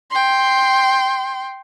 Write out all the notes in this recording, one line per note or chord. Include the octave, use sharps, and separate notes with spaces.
G5 C6